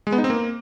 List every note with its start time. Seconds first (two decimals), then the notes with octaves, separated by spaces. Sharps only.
0.07 G#3
0.12 B3
0.18 D#4
0.24 C4
0.30 A#3